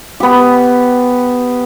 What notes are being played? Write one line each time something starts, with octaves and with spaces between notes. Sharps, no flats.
B3 G4